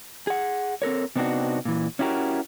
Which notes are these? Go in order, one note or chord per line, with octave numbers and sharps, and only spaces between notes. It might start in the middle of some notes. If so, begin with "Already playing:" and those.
G#4 F#5
C4 A4 A#4 C#5
C3 B3 C4 D4 D#4 F#4
A#2 E3
C#4 E4 F#4 G4 A#4